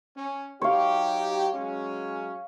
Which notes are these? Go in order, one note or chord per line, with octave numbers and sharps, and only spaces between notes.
C#4
F#3 D#4 G4 C#5 F5
F#3 G#3 C#4